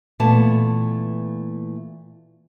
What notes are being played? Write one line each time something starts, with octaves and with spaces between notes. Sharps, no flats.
A#2 E3 A3 B3 A5